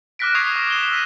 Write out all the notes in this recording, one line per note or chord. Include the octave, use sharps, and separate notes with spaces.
D6 F6 F#6 A#6 B6 D7
C#6 D#6 G#6 C7 F7
D6
D#6 E7 G7
E6 B6 D#7